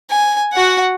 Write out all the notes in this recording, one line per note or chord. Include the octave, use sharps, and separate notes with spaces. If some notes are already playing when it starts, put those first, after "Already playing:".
G#5
F#4 F#5